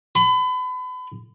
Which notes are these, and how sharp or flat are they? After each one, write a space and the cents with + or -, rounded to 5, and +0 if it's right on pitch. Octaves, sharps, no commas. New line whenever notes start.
B5 +35